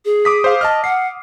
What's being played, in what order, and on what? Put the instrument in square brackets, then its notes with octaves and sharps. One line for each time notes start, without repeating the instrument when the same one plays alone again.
[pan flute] G#4
[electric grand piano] D6 D#6 B6
C5 F5
[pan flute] D#5 [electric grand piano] A5 F6
[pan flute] F#5 [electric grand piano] C7